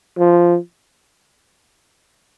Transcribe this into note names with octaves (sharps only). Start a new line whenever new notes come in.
F3